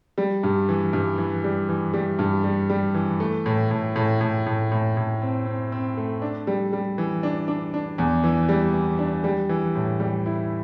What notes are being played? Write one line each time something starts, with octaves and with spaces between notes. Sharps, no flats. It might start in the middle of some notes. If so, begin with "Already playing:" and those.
G3
G2
E3
G2
E3
G3
E3
G3
G2
G3
G3
E3
A3
A2
A2
A2
A2
A2
A2
A2
C4
C4
C4
A3
D4
G3
G3
E3
D4
D4
D4
E2
E3
G3
E3
D4
G3
E3
A2
G3
E4